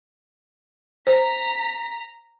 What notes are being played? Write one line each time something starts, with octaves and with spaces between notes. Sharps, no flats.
C5 A#5 B6